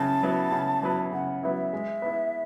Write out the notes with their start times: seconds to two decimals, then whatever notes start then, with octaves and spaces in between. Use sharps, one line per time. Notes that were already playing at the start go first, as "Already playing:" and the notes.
Already playing: C#3 F#3 B3 E4 A5
0.23 F#3 B3 E4 B4
0.52 C#3
0.82 F#3 B3 E4 B4
1.12 C#3 F#5
1.42 F#3 B3 E4 B4 E5 F#5
1.73 G#3
2.02 B3 E4